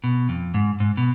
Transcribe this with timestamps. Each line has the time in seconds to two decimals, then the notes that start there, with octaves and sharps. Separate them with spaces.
0.04 B2
0.29 F2
0.54 G#2
0.80 G#2
0.97 B2